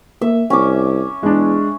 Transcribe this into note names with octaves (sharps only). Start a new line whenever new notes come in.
A#3 E5
C2 C#4 D6
E2 G#3 D4